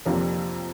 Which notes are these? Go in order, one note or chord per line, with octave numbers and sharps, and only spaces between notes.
F2 C3 F3 A#3 D4